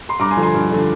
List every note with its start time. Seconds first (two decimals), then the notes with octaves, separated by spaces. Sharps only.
0.09 C6
0.19 G2 A#5 D6
0.31 G#5 C6
0.37 D3 F3
0.43 G#5 C6
0.54 G2
0.72 D3 F3